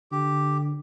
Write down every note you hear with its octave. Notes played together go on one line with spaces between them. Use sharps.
D3 G4